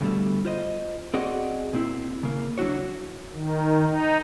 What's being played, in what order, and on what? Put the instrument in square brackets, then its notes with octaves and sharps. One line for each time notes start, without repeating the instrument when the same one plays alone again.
[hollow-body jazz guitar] D2 G2 B2 G3 A3
F4 C5 D#5
C4 F#4 G#4 D5 D#5 F#5
A#2 C4 E4
C#3 A#3
F#3 D4 E4 F#4 C#5
[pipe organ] D#3
D#4